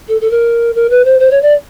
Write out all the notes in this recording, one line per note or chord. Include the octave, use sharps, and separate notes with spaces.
A4
A4
A#4
A#4
B4
C5
C5
C#5
D5